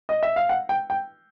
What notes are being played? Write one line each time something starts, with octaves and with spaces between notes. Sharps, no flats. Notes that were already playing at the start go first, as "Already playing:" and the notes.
D#5
E5
F5
F#5
G5
G5